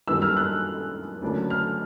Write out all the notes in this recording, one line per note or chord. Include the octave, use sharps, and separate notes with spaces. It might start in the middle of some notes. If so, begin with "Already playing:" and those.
F#2 D#3 G3 A#3 D4 E6
F6
F#6
D2 C#3 F#3 A#3 D4
F6